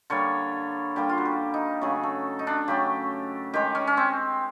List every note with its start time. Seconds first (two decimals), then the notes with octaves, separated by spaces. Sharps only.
0.10 D3 G3 A#3 C#5
0.96 D3 G3 A#3 G4
1.09 F4
1.18 F#4
1.25 G4
1.54 D#4
1.81 C#3 F#3 A3 G#4
2.03 A4
2.39 D#4
2.47 D4
2.68 C#3 F#3 A3 G4
3.54 D#3 G#3 G4
3.75 C#4
3.87 C#4
3.97 C4